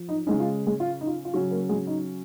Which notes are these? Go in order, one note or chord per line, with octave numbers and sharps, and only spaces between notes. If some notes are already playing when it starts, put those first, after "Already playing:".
Already playing: F3
D#4
C#3 G#3 C#4 D#4
F4
G#3 G#4
F4
D#4
F4
F4
C#3 F#3 C#4 F#4
A#3 A#4
G#3 G#4
D#4